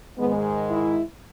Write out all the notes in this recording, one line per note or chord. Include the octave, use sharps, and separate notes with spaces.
G#2 D#3 G#3 B3
E4